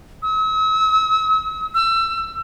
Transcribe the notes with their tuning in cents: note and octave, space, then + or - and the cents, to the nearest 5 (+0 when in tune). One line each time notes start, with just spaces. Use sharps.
E6 -45
E6 +25